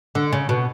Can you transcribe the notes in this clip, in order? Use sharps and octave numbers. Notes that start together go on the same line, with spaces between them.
D3
C#3
B2